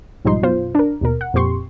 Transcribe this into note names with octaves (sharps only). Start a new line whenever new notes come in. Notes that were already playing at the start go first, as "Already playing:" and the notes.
B1 G#2 F3 G3 D#4 C6
F#2 B2 F4 C5
D4 A#4
D#2 B2 A#4
F#5
F2 A#2 C4 G4 C6 C#6